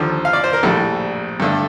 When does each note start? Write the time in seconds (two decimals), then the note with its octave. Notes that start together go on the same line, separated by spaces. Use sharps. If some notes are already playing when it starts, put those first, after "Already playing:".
Already playing: D#2 D3 F3
0.25 F5
0.33 D5
0.44 C5
0.53 A#4
0.63 A#1 A2 G3 A4
1.40 G2 D3 A3